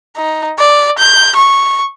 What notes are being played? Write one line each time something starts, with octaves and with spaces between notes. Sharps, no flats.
D#4
D5
G6
C#6